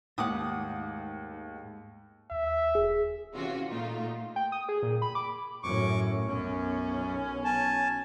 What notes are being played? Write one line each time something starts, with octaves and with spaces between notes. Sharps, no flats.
D#2 G#2 A3 F#5 D6 D#6
D#2 E5
D1 G#4
C3 E3 C#4 F4 F#4
A#2 A3 D#4 F4
G5
D#6
G#4
A#2
B5
D6
F#2 A2 C#4 C#6 D6
B1 F#2 B2 C#4
G#5 A5